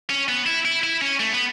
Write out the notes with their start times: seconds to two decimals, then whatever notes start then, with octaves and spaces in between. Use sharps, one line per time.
0.10 C#4
0.28 B3
0.46 E4
0.65 E4
0.84 E4
1.02 C#4
1.20 A3
1.32 B3